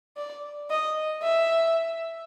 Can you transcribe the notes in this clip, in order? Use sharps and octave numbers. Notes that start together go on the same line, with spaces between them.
D5
D#5
E5